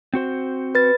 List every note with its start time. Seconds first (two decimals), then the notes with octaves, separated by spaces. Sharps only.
0.14 C4 F#4 C5
0.75 B4 A6